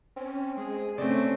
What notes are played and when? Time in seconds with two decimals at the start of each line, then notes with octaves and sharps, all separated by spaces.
0.16 C4 C#4
0.57 G#3 G#4
0.98 C3 A3 C4 C#4 C5 D5